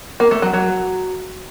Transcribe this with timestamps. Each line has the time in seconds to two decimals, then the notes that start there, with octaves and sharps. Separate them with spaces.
0.20 A#3
0.31 A3
0.42 F#3
0.54 F#3